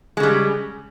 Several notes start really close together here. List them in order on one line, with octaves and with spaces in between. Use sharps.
G#3 C#3 G3